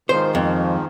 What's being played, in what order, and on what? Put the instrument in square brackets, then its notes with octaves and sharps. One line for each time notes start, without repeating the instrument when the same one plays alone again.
[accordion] G#2 D#3 F3 [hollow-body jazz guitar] C5
[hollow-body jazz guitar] F2